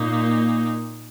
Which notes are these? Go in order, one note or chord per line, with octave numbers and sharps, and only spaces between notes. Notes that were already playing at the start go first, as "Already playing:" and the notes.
Already playing: A#2 A#3 D#4